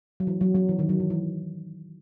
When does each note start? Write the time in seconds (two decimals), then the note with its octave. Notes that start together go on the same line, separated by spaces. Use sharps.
0.20 F#3
0.27 E3
0.41 F#3
0.55 F#3
0.69 E3
0.79 D#3
0.89 F#3
1.00 E3
1.10 E3